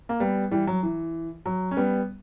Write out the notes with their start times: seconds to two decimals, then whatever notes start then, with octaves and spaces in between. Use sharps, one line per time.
0.09 A#3
0.20 G3 B3
0.51 E3 G3
0.67 F#3
0.83 E3
1.46 F#3
1.71 C#4
1.77 G3 B3